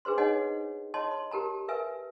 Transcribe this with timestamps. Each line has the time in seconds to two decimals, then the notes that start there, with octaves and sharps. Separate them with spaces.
0.05 D4 G#4 B4 C5 C6
0.18 D#4 C#5 D#5 F#5 G#5
0.94 C#5 D#5 A5 C6
1.11 C6
1.31 G4 A#4 A5 A#5
1.68 A#4 B4 E5 G#5